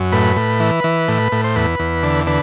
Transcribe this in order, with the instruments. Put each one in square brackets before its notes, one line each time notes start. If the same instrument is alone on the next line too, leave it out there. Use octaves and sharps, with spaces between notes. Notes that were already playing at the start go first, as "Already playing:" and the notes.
Already playing: [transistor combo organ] F#2
A2 B4
A2
E3
E3
A2
A2
C5
E2 B4
E2
D3
D3 B4